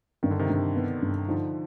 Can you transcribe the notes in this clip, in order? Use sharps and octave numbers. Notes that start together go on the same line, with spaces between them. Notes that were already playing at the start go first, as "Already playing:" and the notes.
G2 D#3
D3
C3 D#3
G2
B3
G2
D3 F3 D#4